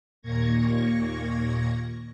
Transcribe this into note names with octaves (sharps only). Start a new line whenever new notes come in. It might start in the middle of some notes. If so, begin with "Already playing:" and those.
D#2 A#2 A#3 C#6 G#6 A#6